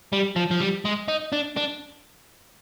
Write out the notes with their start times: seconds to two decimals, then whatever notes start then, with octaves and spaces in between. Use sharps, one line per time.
0.13 G3
0.36 F3
0.51 F3
0.60 G3
0.85 G#3
1.08 D#4
1.32 D4
1.57 D4